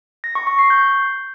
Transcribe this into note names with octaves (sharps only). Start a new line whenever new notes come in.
A#6
C#6
C#6
C7
G6